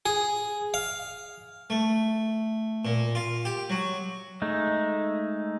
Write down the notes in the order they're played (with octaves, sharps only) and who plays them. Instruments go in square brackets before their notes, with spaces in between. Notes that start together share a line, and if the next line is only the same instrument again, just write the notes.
[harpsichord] G#4
F5
A3
A#2
F4
G4
F#3
[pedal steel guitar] G#3 A3 D#4